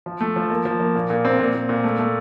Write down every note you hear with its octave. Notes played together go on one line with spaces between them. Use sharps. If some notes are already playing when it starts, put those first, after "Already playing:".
F3
A3
F3
A#3
F3
A#3
A#2
A#2
C4
A#2
A#2
A#2
A3
A3